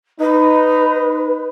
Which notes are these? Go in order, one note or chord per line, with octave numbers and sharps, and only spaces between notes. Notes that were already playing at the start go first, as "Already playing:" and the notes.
D#4 B4